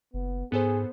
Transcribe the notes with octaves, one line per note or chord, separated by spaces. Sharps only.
F#1 B3
G#2 B3 G#4 A4 C5